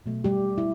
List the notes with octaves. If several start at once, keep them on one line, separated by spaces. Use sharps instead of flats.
B2 F#3 A3
G3 G4
E4